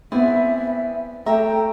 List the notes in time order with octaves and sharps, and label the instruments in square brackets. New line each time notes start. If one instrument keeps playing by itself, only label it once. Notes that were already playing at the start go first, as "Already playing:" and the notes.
[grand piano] B3 C4 [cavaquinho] E4 G#4 D5 [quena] E5
[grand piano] A3 [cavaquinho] C#5 E5 A#5 [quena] G5